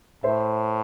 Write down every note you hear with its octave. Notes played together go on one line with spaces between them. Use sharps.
A2 C5 E5